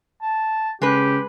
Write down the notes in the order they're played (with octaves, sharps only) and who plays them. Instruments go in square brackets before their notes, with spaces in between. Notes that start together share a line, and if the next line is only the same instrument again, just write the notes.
[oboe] A5
[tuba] C#3 [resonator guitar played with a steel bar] G#3 B4 [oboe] G4